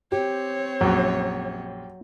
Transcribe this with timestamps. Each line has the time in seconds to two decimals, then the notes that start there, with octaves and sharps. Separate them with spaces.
0.12 C4 G4 C#5
0.81 A#1 F#2 F#3